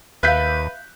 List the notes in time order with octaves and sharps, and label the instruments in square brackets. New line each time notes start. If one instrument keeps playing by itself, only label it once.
[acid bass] D#2 [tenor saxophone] B4 [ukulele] E5 F5 [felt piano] F#6 G6 B6